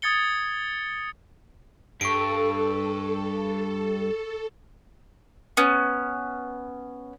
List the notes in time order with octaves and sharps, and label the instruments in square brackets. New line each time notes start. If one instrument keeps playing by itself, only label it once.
[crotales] D#6 G#6 A6 C#7 G7
[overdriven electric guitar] G2 [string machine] A4 [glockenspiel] C#6 D7
[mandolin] B3 C#4